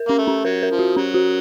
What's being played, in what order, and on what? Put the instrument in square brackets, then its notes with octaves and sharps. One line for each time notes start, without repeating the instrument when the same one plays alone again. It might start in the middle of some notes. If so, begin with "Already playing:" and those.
Already playing: [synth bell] A#4
[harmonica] A#3 [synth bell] C#4
[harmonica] A3
[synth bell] C#4
[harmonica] F#3 [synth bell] A#4
[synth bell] A#4
[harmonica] F3
[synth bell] F#4
[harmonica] F#3 [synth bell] C#4
[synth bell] F#4